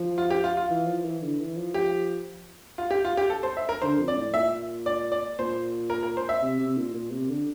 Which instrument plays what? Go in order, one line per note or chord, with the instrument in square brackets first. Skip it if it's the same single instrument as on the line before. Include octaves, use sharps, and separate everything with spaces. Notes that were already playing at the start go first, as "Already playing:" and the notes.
Already playing: [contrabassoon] F3
[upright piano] F4
G4
F4
F4
[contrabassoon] E3
F3
E3
D3
E3
F3
[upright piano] G4
F4
G4
F4
G4
A4
C5
E5
A#4
[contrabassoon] D3 [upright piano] C5
[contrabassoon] F2
[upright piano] D5
[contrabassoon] A2
[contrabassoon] A#2 [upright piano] E5
[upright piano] D5
D5
[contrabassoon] A#2 [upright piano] C5
[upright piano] A#4
A#4
C5
E5
[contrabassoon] C3
C3
A#2
A#2
C3
D3